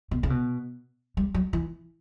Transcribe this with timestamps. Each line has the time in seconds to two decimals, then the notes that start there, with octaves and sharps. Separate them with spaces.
0.11 B2
0.23 C#3
0.30 B2
1.17 G3
1.34 F#3
1.53 E3